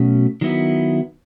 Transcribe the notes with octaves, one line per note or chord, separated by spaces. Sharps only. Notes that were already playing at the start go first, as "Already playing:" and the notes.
Already playing: B2 F#3 A3 C#4
D#3 F#3 B3 E4